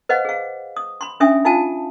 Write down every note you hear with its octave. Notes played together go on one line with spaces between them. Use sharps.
B4 C5 D#5 F5 F#5
G#4 F5
D#6
B5 C6
C#4 D4 E5 G#5 D#6
D#4 F4 F5 G#5 A5